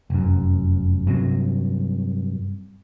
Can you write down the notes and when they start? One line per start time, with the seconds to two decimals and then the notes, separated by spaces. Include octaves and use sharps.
0.10 F1 F#2
1.07 G2 C3 F#3